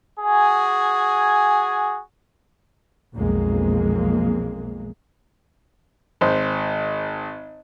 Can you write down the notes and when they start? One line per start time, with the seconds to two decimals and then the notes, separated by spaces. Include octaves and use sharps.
0.20 F#4 G#4 G#5
3.14 B1 F2 G#3 A#3
6.21 G#1 C5